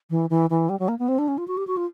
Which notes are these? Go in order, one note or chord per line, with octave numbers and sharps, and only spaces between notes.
E3
E3
E3
G3
F#3
A#3
B3
C4
D4
C#4
F4
F#4
G4
F#4
F4